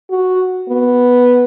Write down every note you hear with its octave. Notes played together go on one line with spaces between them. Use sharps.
F#4
B3